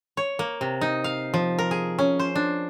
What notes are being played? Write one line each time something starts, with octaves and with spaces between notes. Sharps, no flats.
C#5
A#3
C3
D#4
F5
F3
A#4
G#4
C#4
C5
D4